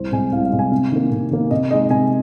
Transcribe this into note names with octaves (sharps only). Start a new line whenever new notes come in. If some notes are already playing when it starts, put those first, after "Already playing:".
Already playing: C2 C5
C3 G#3 G#5
C2 F5
F5
C3 G#3
G#5
C3
D#3 A#3
C3
D#3 A#3
C3 D#5
G#3 D#4 D#5
C3 G#5